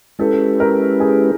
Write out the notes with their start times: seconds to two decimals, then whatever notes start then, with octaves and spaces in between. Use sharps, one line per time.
0.19 G#3 C#4 E4 G4 A4 B4
0.60 A#4
1.00 G#4